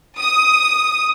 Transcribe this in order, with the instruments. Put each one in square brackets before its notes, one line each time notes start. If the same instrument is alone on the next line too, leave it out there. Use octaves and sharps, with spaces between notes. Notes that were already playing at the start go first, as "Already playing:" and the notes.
[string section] D#6